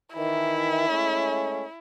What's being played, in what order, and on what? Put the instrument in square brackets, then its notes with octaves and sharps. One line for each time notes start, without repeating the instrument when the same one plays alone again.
[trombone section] D#3 E3 [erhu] E4
[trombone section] G#3 A3 C#4